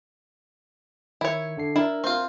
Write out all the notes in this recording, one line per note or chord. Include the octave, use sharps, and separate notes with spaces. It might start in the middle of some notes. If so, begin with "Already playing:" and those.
D#3 E4 C#5
D3 D4 C7
D4 E4 A#4
C4 F4